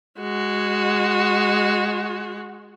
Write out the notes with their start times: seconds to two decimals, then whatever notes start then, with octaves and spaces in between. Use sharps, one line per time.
0.20 G#3 F#4